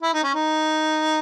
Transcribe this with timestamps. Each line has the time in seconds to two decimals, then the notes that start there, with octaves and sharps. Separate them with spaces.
0.03 E4
0.13 D#4
0.24 C#4
0.34 D#4